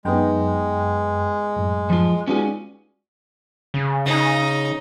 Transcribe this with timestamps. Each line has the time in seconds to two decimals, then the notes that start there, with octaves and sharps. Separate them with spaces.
0.05 F#2 G#3 B3 D#4 G5
1.56 F#2 A2
1.90 F3 F4
2.27 G#3 B3 C#4 D#4 F4 F#4 D5 G#5
3.74 C#3
4.06 C#3 D#4